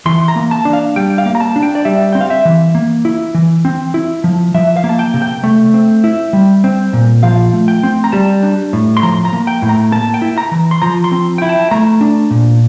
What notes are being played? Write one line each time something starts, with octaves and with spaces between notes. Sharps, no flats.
E3 C6
A#5
A#3
A5
D4
F5
G3 G5
F5
A#3
A#5
A5
D4
G5
D5
G3 E5
C4 G5
F5
E5
E3
A#3
E4
E3
C4
E4
F3
F3 E5
F5
A#3
A5
G5
C3
G5
A3
C4
E4
G3
C4
A#2
F3 F5
A3
G5
C4
A#5
G3 A5
D4
A2
C6
F3 A#5
A#5
A#3
G5
A2
A#5
A#3 A5
G5
E4
A#5
E3
C6
F3 A#5
C6
C4
E4 G5
A5
A3 A#5
D4
A#2